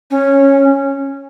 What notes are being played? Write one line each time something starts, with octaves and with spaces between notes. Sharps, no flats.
C#4